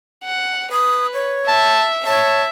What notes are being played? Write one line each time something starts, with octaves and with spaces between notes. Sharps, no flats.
F#5
B4 D#6
C#5
E5 A5
C#5 E5 A5